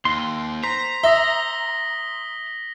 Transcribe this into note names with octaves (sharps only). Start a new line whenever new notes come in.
D#2 C6
C5 A#5 B6
E5 D#6 A#6 G7